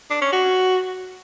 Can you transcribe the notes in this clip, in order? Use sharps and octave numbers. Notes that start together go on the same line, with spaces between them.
D4
C#4
F#4